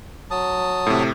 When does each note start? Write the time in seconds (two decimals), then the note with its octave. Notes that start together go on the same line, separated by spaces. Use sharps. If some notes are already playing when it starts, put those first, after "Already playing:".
0.31 F#3 A5 D#6
0.87 A2 C3